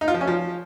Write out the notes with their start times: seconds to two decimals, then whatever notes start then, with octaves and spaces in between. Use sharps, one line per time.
0.01 D#4
0.08 F4
0.14 F3
0.21 C#4
0.27 F3